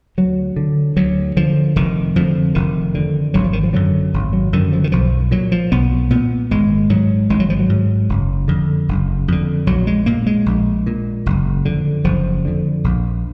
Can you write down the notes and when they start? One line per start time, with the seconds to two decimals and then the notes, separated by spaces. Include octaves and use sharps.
0.18 D2 F#3
0.56 D3
0.97 D2 F#3
1.37 D3 F3
1.76 F1 D#3
2.16 F2 D3 F3
2.55 F1 D#3
2.95 F2 D3
3.34 G#1 F#3
3.44 F3
3.53 D#3
3.63 F3
3.73 F#2 D3 F#3
4.14 G#1
4.33 F#3
4.53 F#2 D3 D#3
4.73 F3
4.84 D#3
4.92 B1 F3
5.31 A#2 F#3
5.52 F3
5.72 B1 B3
6.11 A#2 B3
6.51 G#1 G#3
6.90 G#2 F#3
7.30 G#1 G#3
7.40 F#3
7.50 F3
7.59 F#3
7.69 G#2
8.09 F#1
8.48 F2 D3
8.89 F#1
9.28 F2 D3
9.67 A#1 F#3
9.87 G#3
10.06 A#2 A#3
10.26 G#3
10.46 A#1
10.86 A#2
11.26 F#1
11.65 F2 D3
12.04 F#1 F3
12.45 F2 D3
12.84 A#1